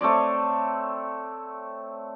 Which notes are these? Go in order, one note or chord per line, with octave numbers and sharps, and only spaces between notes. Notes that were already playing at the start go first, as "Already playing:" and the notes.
A3 C4 C#5 D5